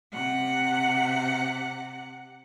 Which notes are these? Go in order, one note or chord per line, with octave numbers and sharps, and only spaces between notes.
C3 F#5